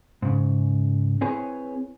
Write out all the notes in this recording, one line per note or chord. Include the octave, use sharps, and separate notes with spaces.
G#2 C#3
C4 E4 G#4 B4 C#5 G#5